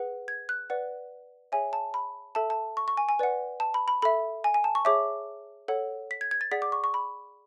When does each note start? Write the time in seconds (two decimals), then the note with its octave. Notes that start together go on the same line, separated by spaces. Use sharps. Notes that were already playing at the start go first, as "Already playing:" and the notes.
Already playing: G#4 B4 F#5
0.28 G#6
0.49 F#6
0.70 B4 D5 F#5
1.52 G#4 C#5 E5 G#5
1.73 A5
1.94 B5
2.35 A4 E5 A5
2.50 A5
2.77 C#6
2.88 C#6
2.97 G#5
3.09 G#5
3.19 B4 D5 F#5
3.60 A5
3.74 B5
3.88 B5
4.02 A4 E5 B5
4.44 G#5
4.54 G#5
4.64 A5
4.75 C#6
4.85 G#4 C#5 E5 D6
5.68 A4 C#5 F#5
6.11 B6
6.21 G#6
6.31 G#6
6.41 A6
6.52 G#4 D5 F#5 B6
6.62 D6
6.72 C#6
6.84 C#6
6.94 B5